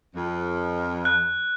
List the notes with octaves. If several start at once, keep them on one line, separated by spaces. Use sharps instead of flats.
F2
F#6